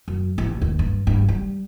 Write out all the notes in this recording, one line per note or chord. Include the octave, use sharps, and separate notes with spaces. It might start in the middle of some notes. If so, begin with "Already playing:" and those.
F#2
A1
D#2
G2
G2
G3